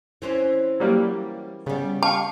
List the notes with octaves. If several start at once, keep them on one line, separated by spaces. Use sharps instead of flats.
E3 C4 C#4
F#3 G3 A#3
C#3 G3 B3
F5 A5 C#6